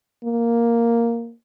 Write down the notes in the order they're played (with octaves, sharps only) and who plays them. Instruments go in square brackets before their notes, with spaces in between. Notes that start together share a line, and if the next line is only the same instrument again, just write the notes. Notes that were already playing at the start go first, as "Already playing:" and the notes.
[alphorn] A#3